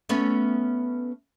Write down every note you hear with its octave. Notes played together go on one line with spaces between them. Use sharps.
A3 B3 C#4